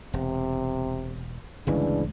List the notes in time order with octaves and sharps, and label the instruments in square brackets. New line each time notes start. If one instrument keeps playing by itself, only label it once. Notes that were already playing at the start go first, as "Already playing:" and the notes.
[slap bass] E1 [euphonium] C3
[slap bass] G1 D2 [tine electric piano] C#3 E3 G#3 [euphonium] D4